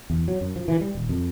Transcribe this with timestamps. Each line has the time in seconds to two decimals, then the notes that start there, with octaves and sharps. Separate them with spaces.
0.10 E2
0.28 F#3
0.41 F#2
0.56 F3
0.68 E3
0.81 G3
0.95 D#1
1.09 F2